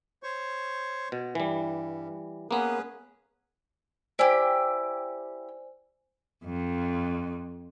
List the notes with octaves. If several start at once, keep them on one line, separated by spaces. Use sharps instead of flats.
C5 C#5 C#6
B2
G2 E3 G3
A#3 B3 C#4 G#4 B4
E4 G4 C5 D5 G#5
F2